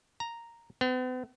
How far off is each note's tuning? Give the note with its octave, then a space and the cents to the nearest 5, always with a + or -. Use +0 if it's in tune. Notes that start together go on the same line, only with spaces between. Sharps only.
A#5 -5
B3 +45